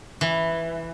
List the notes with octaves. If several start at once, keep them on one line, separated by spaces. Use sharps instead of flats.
E3